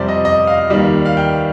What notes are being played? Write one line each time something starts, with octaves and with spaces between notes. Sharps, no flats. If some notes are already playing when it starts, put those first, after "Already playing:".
Already playing: F2 C3 G3 C5 D5
D#5
D#5
F5
D#2 D#3 G3
F5
G5